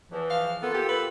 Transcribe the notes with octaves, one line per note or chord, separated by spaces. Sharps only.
E2 E3 F3
F5
A#3 B3 F4 A4
G4
B4